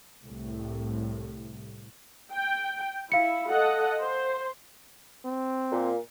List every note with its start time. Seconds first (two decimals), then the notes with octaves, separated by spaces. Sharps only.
0.24 C2 A2
2.32 G5
3.12 E4 F5 C#7
3.51 A4 D#5 F#5
4.02 C5
5.25 C4
5.72 A#2